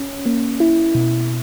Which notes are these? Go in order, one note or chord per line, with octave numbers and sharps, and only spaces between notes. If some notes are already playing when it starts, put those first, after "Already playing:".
Already playing: C#4
A#3
E4
B2